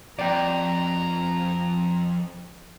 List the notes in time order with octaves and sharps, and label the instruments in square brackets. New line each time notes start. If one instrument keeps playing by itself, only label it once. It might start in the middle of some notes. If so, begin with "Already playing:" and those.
[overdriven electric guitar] F2 [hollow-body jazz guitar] D5 G5 [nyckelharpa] A#5